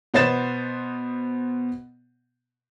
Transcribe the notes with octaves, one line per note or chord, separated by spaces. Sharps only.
B2 B3 C5 A6 E7